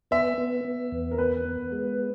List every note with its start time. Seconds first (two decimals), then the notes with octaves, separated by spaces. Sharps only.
0.11 B3 E5
0.38 B3
0.65 B3
0.92 E2
1.11 A#4
1.18 B3 B4
1.45 B3
1.72 G#3